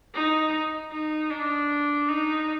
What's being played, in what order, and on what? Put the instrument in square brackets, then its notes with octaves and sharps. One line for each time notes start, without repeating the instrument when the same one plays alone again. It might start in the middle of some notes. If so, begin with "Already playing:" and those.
[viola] D#4
D#4
D4
D#4